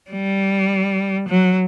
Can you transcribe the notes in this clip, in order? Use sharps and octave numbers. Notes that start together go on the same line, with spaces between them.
G3
F#3